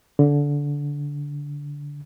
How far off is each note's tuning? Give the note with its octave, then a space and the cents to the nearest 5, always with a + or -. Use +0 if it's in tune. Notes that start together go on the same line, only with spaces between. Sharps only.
D3 -20